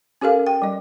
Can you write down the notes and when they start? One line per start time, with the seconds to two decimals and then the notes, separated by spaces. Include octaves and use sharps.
0.21 C#4 G4 A4 A#4 F5
0.47 G5
0.62 G3 D#5